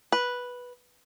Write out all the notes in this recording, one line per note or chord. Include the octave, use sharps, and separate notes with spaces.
B4